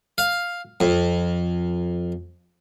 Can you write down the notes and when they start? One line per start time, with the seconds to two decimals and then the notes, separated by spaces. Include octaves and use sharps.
0.18 F5
0.80 F2